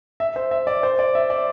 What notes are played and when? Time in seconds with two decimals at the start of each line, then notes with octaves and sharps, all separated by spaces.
0.20 E5
0.36 C5
0.51 E5
0.67 D5
0.83 C5
0.99 D5
1.15 E5
1.30 D5